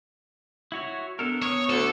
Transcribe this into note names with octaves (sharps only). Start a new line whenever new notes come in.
E4 F#4 C#5
B3 D4 A4 A#4
C#5 D#6
D2 A4